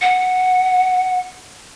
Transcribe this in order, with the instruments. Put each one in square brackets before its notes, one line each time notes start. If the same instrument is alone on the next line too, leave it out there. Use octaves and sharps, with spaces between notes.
[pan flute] F#5